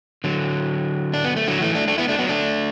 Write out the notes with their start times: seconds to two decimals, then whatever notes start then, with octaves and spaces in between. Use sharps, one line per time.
0.24 D3 F#3
1.14 D4
1.24 B3
1.37 A3
1.47 D3 F#3
1.61 E3 A3
1.75 A3 D4
1.88 A3 D4
1.98 B3 E4
2.08 A3 D4
2.19 F#3 B3
2.29 A3 D4